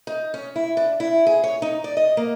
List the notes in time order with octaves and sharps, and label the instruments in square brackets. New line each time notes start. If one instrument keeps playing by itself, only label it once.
[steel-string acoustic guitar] D#4
C#4
E4
D4
E4
G#4
C#5
D#4
D5
D#5
A#3